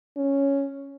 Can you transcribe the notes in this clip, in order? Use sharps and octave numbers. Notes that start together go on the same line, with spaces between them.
C#4